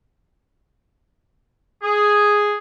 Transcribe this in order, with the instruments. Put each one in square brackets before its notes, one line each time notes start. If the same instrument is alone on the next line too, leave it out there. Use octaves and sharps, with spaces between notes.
[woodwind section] G#4